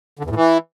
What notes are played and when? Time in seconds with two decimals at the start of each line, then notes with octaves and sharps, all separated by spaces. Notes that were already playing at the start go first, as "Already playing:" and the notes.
0.19 D3
0.25 E2
0.30 A2
0.36 E3